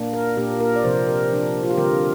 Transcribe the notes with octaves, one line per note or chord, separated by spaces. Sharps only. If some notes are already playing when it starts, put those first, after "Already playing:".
Already playing: A#2 A#3 D4
A#4
A#2 A#3 D4 G4
A#4
D5
C3 F3 C4 C5
A#4
F3 D4
F4
G4
D3 G3 C4 A#4